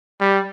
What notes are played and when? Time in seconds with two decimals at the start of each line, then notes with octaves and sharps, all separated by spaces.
0.21 G3